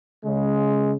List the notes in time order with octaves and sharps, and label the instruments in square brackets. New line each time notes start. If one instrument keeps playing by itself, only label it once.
[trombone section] C#3 G#3